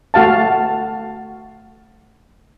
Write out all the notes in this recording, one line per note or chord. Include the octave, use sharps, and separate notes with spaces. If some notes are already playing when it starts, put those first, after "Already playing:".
A3 F#4 F5 A5